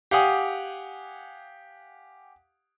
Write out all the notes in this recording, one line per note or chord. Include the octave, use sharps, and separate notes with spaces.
G4 F5 F#5 G#5 D#6